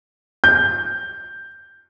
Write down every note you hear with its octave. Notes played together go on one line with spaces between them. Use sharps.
G6